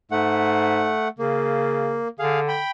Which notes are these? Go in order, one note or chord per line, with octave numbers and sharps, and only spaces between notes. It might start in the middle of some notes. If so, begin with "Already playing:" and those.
G#2 A3 F#5
C#3 A#3
D3 G#4 F5
G5 B5